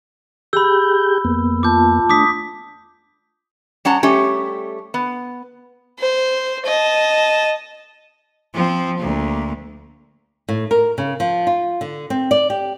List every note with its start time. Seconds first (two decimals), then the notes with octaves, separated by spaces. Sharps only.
0.53 G4 G#4 B5 E6 G6
1.25 F2 A#3 B3
1.63 F4 A5 D6 G6
2.09 A3 D4 D6 D#6 B6
3.85 G3 C#4 F#5 A5 A#5
4.03 G3 A3 C#4 G4
4.94 B3
6.00 C5
6.66 D#5 A5
8.54 F3 C4
8.98 D2 A#3
10.49 A2
10.71 A#4
10.98 C#3
11.20 F3
11.47 F4
11.81 D3
12.10 C4
12.31 D5
12.50 G4